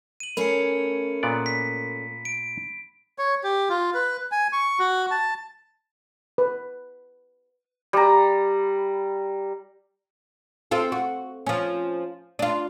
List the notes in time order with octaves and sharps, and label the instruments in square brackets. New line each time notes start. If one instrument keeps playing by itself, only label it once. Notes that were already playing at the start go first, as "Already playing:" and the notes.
[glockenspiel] D#7 F#7
[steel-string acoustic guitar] A3 C#4 G#4 [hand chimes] A#4 [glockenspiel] B5 C#7
[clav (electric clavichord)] A#2 B3 D5
[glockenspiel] B6
D7
[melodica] C#5
G4
F4
B4
G#5
C#6
F#4
A5
[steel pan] B4
[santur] G3 A#5
[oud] C4 F4 A4
F#4
F3 C#4
D4 F4